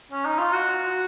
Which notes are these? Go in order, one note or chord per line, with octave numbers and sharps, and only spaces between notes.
C#4
D#4
F4
F#4